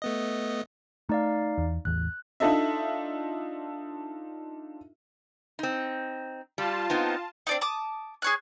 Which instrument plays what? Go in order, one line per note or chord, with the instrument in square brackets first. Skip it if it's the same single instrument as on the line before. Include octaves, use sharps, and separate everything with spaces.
[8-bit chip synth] A3 B3 D#5
[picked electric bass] A3 [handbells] D#4 D5 F5
[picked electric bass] E2
[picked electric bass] A1 E2 [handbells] F#6
[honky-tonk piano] D4 D#4 F4 A4 D#5 E5
[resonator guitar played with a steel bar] C4 D#4
[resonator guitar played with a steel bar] G3 [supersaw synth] F4 A5
[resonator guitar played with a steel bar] B3 C4 D#4
[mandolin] C4 D4 D#4
A5 D6 D#6
G#4 C#5 F#6